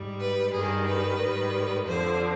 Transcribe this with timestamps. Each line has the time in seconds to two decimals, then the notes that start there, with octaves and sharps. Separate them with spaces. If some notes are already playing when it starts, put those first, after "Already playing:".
Already playing: G#2 G3
0.21 B4
0.53 G2 D#3 G3 G#4
0.87 B4
1.20 G#2 D#3 G3
1.87 F2 D3 F3 C5